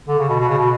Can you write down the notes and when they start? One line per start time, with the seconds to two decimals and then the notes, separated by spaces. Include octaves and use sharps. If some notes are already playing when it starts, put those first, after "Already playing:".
0.08 D3
0.18 C#3
0.29 B2
0.39 B2
0.49 C#3
0.58 B2